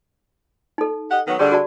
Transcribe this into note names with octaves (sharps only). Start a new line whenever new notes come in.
D#4 A4
G4 D#5 F#5
D#3 F#3 B3
D3 G3 G4 G#4 D5
F#4 D5 A5